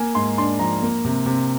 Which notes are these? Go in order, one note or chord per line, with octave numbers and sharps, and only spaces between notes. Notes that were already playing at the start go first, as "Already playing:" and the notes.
Already playing: A#3 G#5
G#2 C6
D4 C6
F3 A#5
A#3
C3
C3